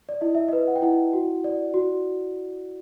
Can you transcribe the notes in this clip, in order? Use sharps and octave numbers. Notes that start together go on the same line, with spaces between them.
D5
E4 D#5
E5
B4 D#5
F#5
G5
E4 F#5
F#4
D5
F#4